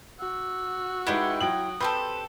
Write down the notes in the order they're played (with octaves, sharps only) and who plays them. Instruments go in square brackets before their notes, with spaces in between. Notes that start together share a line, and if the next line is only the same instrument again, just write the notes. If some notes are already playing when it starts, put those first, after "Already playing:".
[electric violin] F#4 [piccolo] E6
[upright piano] G#3 D#4 B4 [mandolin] E4 G4 [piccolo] F#5
[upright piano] F#3 G5 F#7 [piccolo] D#6
[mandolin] C4 G4 A4 [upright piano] B4